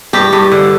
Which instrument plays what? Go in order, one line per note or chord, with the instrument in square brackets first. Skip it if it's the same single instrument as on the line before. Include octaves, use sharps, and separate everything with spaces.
[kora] G2 G4
G2
D3